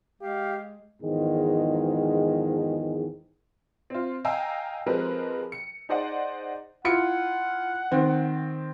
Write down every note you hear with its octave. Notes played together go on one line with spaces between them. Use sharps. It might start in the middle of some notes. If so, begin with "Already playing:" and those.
G#3 G4 F5
E2 G#2 D#3 F3 G#3
C4 F4
D#5 F5 G5 G#5 A#5 E6
F3 G#3 C4 G4 A#4 B4
C#7
D#4 G#4 C5 D5 D#5 F#5
E4 F4 F#5 C#7
D#3 C4